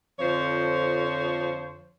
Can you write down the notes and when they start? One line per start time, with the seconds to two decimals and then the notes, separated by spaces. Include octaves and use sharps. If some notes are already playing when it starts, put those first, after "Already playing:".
0.19 F2 D3 F3 C5 C#5